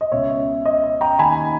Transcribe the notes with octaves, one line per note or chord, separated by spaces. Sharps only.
D#5
C#2 B2 C#5 E5
D#5
D#5
G5 A#5
D#2 D#3 G#5 B5